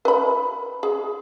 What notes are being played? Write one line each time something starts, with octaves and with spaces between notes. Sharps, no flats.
B4 B5
G#4